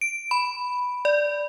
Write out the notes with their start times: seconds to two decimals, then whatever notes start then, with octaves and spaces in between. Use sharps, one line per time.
0.01 D7
0.31 B5
1.05 D5